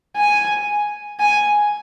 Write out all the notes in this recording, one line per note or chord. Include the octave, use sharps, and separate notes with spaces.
G#5
G#5